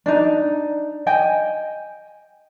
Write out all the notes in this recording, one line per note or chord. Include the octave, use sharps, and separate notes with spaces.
D4 D#4
D#5 G5 G#5